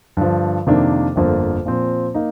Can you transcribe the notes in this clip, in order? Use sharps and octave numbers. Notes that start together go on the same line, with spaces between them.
G2 D3 F3
F2 C3 D#3 A#3 D4
G1 F2 D3 F3 A#3
A#2 F3 C4
A#3 D#4